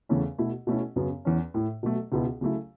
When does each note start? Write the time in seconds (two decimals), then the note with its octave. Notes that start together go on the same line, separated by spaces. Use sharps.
0.09 E2 C#3 A3 C#4 E4
0.38 B2 A3 E4
0.67 B2 A3 C#4 E4
0.96 F#2 C#3 F#3 B3
1.25 E2 E3 C#4
1.54 A2 A3 E4
1.83 B2 F#3 A3
2.12 C#2 B2 B3 E4
2.41 C#3 F#3 A3 E4